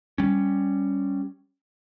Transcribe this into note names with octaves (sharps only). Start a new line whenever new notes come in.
G3 C#4